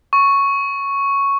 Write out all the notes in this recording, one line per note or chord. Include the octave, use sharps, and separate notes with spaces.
C#6